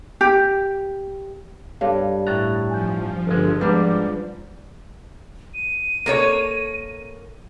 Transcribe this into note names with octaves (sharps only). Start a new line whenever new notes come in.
G4
G2 A4 C#5 F5
A2 A#5 F#6 A6
F3 G#5 G6
G1 G#3
G#2 G3 D4 B4
D#7
A#3 A4 C#5